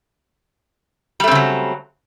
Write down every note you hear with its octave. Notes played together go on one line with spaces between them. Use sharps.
C#3 F#3 G3 A3 C4